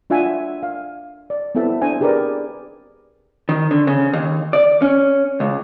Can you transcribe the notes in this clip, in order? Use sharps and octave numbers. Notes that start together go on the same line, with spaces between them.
D4 F4 E5 F#5 G#5
F5
D5
B3 C4 E4 A4 E5 A5
D4 C5 G#5
D4 G4 G#4 A#4 B4 D5
D#3
D3
C#3
D#2
D5
C#4
C#2